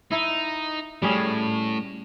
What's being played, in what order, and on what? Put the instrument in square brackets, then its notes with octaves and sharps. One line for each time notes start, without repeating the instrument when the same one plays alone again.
[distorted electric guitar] D#4 [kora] E4
[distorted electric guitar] A2 [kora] G3 C#4 G#4